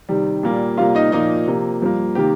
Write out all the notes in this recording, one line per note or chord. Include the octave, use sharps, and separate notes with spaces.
C3 D#3 G3
A#2 G3 A#3
C3 G3 A#3 F4 F5
D#4 D#5
A#2 F3 A#3 D#4 D#5
C3 F3 A#3
G2 F3 A#3
C3 D#3 A#3 G4